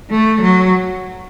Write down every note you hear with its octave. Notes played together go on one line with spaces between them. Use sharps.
A3
F#3